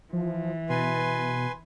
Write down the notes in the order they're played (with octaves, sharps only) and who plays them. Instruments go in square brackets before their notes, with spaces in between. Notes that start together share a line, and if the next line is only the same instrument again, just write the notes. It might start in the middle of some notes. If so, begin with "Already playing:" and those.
[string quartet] E3 [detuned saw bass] F3
[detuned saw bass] B2 [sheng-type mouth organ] B4 G#5 C6